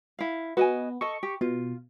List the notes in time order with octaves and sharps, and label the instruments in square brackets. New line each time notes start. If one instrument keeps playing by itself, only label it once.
[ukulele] E4 F5
[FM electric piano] B3 [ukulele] F#4 D#5 G#5
[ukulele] A4 D#5 [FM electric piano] C#6
[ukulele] G4
[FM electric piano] B2 [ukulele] F4